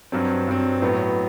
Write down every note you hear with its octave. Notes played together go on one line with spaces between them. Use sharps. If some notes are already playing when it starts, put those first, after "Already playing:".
G2 F#3 C4
G2 F#3 C4
A2 F#3 B3